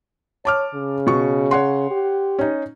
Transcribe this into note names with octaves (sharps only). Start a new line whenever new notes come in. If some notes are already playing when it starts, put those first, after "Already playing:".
C#5 A5 D6 F6
C#3
B2 C#6
C#5 F#5 C6
G4
C#4 D#4